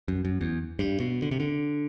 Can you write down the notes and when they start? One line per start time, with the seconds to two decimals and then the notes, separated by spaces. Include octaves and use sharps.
0.08 F#2
0.25 F#2
0.41 E2
0.79 G2
1.00 B2
1.22 D3
1.31 C3
1.40 D3